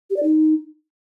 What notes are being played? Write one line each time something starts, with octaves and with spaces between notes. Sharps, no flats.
G4
D5
D#4